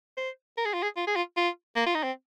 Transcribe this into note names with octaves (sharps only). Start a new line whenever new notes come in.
C5
A#4
G#4
F4
G#4
F4
G#4
F4
F4
A#3
F4
D#4
C4